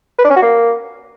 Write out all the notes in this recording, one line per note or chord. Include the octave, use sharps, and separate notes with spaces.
B4
D4
C#4
F#4
A#3